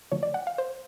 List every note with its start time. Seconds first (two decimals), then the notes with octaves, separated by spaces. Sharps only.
0.12 D3 F3 A3 C#5
0.23 D5
0.34 F#5
0.47 F5
0.58 C5